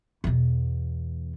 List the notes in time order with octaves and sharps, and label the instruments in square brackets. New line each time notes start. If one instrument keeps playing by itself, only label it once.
[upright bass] E2 B2